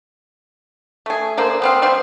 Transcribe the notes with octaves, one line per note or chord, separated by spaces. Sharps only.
A3 G#4
D3 A#3 C5
B3 C4 F5
G3 C4 C5 C6